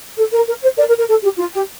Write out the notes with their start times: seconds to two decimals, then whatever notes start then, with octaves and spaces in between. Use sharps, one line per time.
0.17 A4
0.32 A#4
0.48 A#4
0.62 C5
0.77 A#4 D5
0.88 A#4
0.98 A#4
1.08 A4
1.23 G4
1.38 F4
1.54 G4